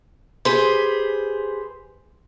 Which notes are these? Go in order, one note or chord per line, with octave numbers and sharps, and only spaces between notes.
G4 G#4 B4 C5